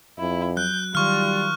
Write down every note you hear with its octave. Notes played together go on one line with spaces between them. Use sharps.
F2 E4
F#3 F#6 G6
D#3 F#3 G3 F4 C#6 F6